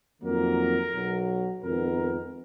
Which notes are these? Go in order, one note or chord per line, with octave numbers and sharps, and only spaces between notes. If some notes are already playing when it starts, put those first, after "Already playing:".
F2 D#3 F#3 A#3 A#4
B1 B2 F#3
F2 D#3 G#3 B3 A#4